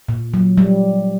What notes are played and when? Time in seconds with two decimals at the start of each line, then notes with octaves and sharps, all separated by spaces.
0.09 A#2
0.34 F#3
0.58 G3